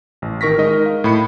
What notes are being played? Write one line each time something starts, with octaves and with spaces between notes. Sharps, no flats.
A1
D#3 A#4 C#6 A#6 B6
G#3 D#4 A#4 D#5
F5
A2 B5 C#7